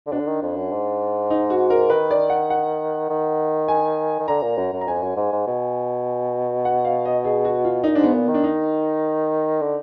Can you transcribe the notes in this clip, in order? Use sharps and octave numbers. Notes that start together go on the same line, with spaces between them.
D3
B2 D4
D3
D#3
F2
F#2
G#2
D#4
F#4
A#4
D#3 B4
D5
F#5
F#5
D#3
G#5
D#3
D3 A#5
A#2
F#2
F#2
A#5
F2 G#5
F#2
G#2
G#2
B2
F#5
F5
D#5
G#4
F#4
F4
A#2 D#4
D4
G#2
B3
A#2
D#3
D4
D#4
D3